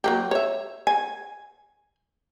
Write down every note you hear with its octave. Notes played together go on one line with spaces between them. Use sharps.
F#3 A#3 G4
C#5 E5
G#5